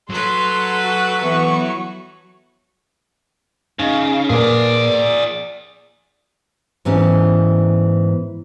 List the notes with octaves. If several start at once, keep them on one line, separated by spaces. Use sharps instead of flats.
F#3 A4 B4 C6
F#4
E3 B3 C#6
C#3 D#4
A#2 G#4 B4 D5
G#2 E3 B3 C#4